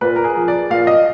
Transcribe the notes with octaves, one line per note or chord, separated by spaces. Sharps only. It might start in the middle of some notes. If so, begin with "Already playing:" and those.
A#2 B4
A#4
G#4
F3
D5
A#2 F5
D#5